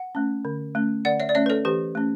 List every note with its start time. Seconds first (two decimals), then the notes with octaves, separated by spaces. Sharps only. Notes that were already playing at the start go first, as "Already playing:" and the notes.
Already playing: F#5
0.15 A3 C#4
0.45 D3
0.75 A3 C#4
1.05 D3 D5 F#5
1.20 C#5 E5
1.29 D5
1.35 A3 C#4 C#5 E5
1.46 B4
1.50 A4 C#5
1.65 E3 G4 B4
1.95 A3 C#4